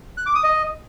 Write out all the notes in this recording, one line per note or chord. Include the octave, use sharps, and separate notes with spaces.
F#6
D6
D#6
D#5